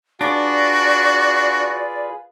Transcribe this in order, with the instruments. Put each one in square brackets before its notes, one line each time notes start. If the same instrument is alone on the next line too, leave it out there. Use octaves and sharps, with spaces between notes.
[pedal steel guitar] D4 [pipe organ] F4 G#4 B4 [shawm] F#4 [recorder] D5